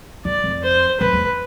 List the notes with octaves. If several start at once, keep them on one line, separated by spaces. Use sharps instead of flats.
E2 D5
F2
C5
F2 B4
E2